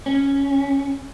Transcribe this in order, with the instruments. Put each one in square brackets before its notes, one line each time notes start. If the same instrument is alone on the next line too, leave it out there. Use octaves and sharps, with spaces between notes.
[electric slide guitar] C#4